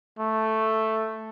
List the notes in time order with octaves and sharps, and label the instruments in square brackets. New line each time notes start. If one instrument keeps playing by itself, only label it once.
[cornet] A3